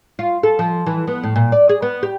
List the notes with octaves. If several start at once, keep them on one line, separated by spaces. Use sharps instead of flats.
F4
A4
F3
E3
B3
A2
A#2
D5
G#4
B3
G4